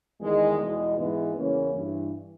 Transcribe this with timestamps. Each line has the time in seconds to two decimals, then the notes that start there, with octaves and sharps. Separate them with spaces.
0.21 E2 D#3 G#3
0.59 E2 B2 G#3
0.97 G#2 E3 G#3 B3
1.35 E2 C#3 E3 A#3 C#4
1.73 G2 E3